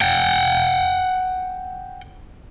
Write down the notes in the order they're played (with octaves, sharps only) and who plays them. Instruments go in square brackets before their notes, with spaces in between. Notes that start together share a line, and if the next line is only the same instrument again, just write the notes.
[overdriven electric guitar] F#5 G5